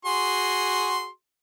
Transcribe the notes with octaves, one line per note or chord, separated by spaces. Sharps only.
F#4 G#4 C6